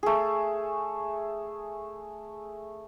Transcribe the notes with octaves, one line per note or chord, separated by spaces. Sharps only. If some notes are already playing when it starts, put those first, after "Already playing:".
A3 G#4